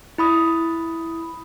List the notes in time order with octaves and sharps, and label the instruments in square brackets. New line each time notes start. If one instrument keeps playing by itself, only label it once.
[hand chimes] E4 B5 D#6